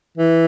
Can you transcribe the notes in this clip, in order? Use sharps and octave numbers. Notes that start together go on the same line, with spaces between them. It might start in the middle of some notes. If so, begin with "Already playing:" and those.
E3